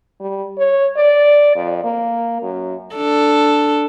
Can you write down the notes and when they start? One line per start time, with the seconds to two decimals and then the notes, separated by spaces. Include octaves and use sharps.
0.20 G3
0.58 C#5
0.96 D5
1.55 F2
1.84 A#3
2.42 F#2
2.96 D4 A4